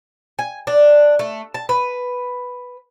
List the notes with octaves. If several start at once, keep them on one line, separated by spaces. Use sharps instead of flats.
G#5
D4
A3
A5
B4